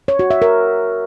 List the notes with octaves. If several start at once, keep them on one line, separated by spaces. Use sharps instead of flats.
C#5
F#4
E5
A#4